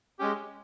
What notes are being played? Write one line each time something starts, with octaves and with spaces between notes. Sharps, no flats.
G#3 C#4 G4